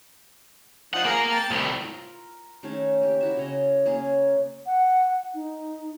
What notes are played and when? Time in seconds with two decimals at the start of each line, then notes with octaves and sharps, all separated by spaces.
0.94 F3 D4 D#4 F#5
1.05 A#3 G#4 A#4 F5
1.31 G5 A5
1.51 C2 A2 D#3
1.80 F4 A#4
2.63 D#3 A3 C#4 G#4
3.01 A#3 G4
3.21 E4 F#4 E5
3.37 C#3 C#5 D#5
3.86 A#3 C#4 G#4
4.66 F#5
5.34 D#4